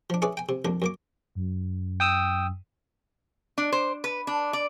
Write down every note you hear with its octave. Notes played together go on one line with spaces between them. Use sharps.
F3 D4
C#4 E4 G#4 B4 D5
G5 G#5
C3
C2 F2 A#3 D4
F#2 A#3 D6
F#2
G5 D#6 E6
D4
C5
B4
D4
D5